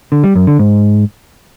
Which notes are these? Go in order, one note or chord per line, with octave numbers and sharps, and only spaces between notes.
D3
G3
F#2
D3
G#2